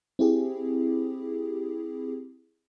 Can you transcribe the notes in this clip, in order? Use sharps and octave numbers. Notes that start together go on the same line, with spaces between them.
C4 E4 G4 G#4